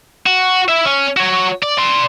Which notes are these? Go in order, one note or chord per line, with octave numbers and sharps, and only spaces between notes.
F#4
E4 E5
C#4
F#4 C#5
D5
D5 C6